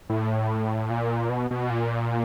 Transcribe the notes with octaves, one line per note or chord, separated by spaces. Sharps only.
A2
A#2
B2
B2
A#2